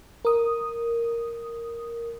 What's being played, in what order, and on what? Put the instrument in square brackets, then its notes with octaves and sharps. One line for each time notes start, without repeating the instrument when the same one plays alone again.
[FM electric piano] A#4 D#6